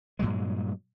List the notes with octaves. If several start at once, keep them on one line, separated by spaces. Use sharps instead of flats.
G2 A#2 F#3 G#3